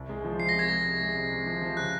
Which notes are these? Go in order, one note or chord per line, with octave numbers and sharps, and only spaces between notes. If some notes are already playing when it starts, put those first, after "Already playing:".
Already playing: C2
G#3
F3
F3 C7
A#6
C3
G#6
G#3 A#6
C3
G#3
C3
C3
F3
F3
C#3 F#6